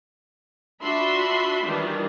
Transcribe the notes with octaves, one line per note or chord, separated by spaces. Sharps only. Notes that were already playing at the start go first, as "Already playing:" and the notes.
D4 F4 F#4 E5 B5 C6
D#3 E3 G3 D4 F4